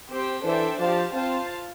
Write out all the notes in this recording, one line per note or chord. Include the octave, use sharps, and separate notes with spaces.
C4 G4 C5 G5
E3 D4 A4 C5 E5 G5
F3 G4 C5 F5 A5
C4 F4 C5 F5 A5